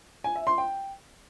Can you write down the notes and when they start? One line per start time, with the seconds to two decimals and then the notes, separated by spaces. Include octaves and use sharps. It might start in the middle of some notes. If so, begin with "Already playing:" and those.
0.24 G#5
0.36 E5
0.47 C6
0.58 G5